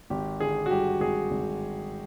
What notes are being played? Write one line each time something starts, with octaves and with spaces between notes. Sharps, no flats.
G#1 G4
D3 G#4
F#4
G2 G4
G#1 G#4
G#1